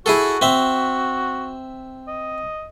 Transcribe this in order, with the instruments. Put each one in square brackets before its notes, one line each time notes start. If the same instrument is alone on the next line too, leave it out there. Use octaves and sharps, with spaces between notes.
[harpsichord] E4 G#4 A4 [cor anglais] F#4
[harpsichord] C4 E5
[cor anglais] D#5